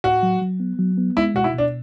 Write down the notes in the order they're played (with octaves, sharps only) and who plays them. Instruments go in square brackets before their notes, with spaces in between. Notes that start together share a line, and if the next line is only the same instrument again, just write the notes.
[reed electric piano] A2 [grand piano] F#4
[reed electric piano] F#3
F#3
B3
F#3
B3
[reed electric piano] G#3 [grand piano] E4
[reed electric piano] B2 [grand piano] F#4
[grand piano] E4
[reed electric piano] B2 [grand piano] D4